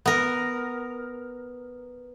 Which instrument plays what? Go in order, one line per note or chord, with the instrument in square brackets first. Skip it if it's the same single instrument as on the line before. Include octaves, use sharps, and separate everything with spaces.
[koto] B3 A#4